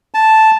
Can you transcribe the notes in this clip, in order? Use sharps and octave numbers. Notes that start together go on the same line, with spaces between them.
A5